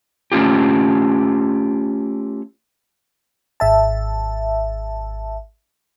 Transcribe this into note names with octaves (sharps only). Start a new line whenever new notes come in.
A3 C#4 F4 G4
G#1 E5 A5